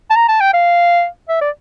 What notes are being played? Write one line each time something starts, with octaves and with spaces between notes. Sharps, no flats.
A5
A#5
A5
G5
F5
E5
D5